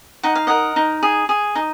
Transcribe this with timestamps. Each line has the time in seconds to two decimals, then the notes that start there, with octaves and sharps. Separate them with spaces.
0.23 D#4 F#5
0.35 F5
0.47 A#4 D#5 F#5
0.76 D#4
1.03 G#4
1.29 G#4
1.55 D#4